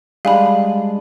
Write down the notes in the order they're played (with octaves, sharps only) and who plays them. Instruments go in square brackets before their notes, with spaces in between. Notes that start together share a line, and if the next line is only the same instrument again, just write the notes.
[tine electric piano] G3 G#3 D4 [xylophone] F5 G#5 B5